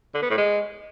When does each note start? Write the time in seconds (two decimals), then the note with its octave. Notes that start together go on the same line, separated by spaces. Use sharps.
0.14 D3
0.22 B3
0.30 A2
0.38 G#3